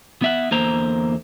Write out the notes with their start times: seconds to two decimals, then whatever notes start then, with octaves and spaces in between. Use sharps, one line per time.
0.22 B3 E5 F#5
0.51 E2 D3 A#3 C5 A#5